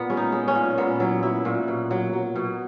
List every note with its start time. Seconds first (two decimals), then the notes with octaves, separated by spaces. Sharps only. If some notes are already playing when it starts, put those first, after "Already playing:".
Already playing: A#2 B3
0.10 G#3 C#4
0.17 D#4
0.32 G#3
0.48 C#4
0.55 A#2
0.78 A#2 B3
1.00 F#3 E4
1.23 F#3 E4
1.45 A#2 F#4
1.68 B2
1.91 F#3
2.13 F#3
2.36 B2